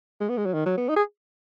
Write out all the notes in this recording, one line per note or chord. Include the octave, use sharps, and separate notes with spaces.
G#3
B3
G#3
F#3
D#3
F#3
B3
D#4
G#4